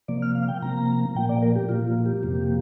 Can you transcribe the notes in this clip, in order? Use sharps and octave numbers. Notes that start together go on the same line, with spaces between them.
C3 F3 A#3 D5
F6
F5
G5
C3 F3 A#3 A#5
A#2 F3 A#3 G5
D5
A#4
G4
A#2 F3 A#3 F4
F4
G4
F2 C3 F3 A#3